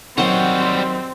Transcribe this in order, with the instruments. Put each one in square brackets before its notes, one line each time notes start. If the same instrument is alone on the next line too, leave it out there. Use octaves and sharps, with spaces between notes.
[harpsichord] D#3 F#3 [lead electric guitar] G3 C#5 [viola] C4 [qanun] C5 F#5